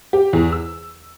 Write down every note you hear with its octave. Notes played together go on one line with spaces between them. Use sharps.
G4
E2
E6